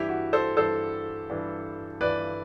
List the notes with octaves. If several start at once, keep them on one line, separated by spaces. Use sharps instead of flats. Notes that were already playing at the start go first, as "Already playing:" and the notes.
Already playing: G2 E3 E4 G4
F#4
A4 C5
G2 E3 A4 C5
G2 E3
G2 E3 B4 D5